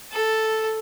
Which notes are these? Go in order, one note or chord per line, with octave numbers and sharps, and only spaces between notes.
A4